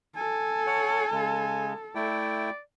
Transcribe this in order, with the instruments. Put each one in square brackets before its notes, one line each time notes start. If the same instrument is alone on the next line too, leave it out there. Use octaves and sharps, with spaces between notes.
[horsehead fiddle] A4 [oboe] G#5
[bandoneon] C#5 F#5
[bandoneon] C#3 G#3 [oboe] G#5
[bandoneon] A3 E4 G5 [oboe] D5